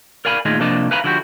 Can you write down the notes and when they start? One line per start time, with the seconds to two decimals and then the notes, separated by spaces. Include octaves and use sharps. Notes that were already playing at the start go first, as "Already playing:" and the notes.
0.25 A#4 D5 F5 G#5 B5
0.45 A#2 D#3 A3 F4 G#4 D#5
0.60 C3 F3 A#3 D4 D#5 A5
0.91 B4 E5 F5 G#5 A#5 B5
1.04 D3 F3 E4 F#4 G4